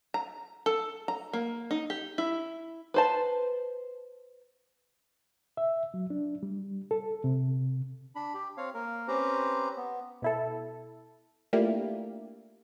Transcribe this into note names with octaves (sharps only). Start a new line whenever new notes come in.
A#5
A4
A#5
A#3
D#4
G4
E4
B4 C5 A5
E5
F#3
D4
G3
A4
C3
D4 B5
G4
C4 C#5 F5
A#3 A#4
C4 C#4 G4 B4 C5 A#5
B3
B2 E4 A4
A3 A#3 D4 E4 F4 G4